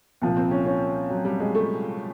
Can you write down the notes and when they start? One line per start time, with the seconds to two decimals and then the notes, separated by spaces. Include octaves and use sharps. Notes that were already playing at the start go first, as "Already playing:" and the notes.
0.22 C2 A#2 F3
0.37 C4
0.51 C#4
0.66 C#4
1.10 F#3
1.25 G3
1.40 G#3
1.55 A3